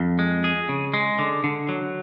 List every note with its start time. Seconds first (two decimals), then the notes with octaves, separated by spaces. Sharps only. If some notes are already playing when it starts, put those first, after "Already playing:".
Already playing: F2
0.19 G#3
0.44 G#4
0.69 C#3
0.94 G#3
1.19 D3
1.44 D3
1.69 F#3